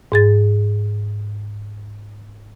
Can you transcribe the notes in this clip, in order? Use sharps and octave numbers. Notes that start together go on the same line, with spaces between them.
G#2 G#4 A6